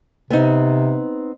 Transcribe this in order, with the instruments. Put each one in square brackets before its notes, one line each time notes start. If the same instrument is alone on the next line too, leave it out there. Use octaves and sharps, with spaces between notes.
[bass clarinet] C3 [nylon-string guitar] B3 C4 D#4